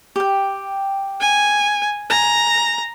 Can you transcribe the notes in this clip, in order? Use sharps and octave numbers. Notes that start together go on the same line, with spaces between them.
G4 G5
G#5
G#5 A#5